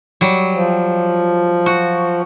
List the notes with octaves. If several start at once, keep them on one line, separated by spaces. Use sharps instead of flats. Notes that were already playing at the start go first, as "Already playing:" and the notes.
F#3 G3
F3
F#4